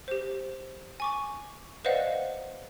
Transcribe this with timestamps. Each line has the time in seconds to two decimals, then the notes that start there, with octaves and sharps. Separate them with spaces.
0.08 G4 C5
1.00 G#5 C#6 D6
1.85 B4 C5 D5 D#5 F5 F#5